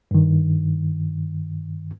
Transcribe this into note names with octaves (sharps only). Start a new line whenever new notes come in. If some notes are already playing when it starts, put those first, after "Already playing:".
G2 D#3